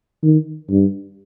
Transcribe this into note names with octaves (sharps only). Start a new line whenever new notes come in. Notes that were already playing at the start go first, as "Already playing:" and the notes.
D#3
G2